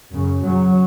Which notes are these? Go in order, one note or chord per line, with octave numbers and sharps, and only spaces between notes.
F#2 C#3
F#2 C#3 F#3